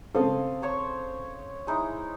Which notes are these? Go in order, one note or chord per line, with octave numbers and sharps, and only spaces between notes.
C#3 C4 A4 F5 D#6
C5 C#5 C#6
G#3 D#4 E4